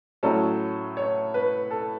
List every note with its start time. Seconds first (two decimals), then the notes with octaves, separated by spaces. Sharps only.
0.23 A2 F#3 C#4 A4
0.97 C#5
1.34 B4
1.71 A4